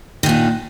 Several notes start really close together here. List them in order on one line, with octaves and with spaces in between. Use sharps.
D#3 A#2 D4